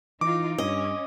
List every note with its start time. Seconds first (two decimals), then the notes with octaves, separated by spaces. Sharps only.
0.21 E3 D#4 F4 D6
0.58 G2 C#4 D#5